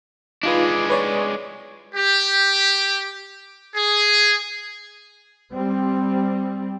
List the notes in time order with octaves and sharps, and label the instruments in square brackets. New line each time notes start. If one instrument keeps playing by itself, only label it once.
[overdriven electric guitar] G#3 D4 [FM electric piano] D#4 F4 B4
[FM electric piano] B4 C#5 D5
[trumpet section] G4
G#4
[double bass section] G3 C4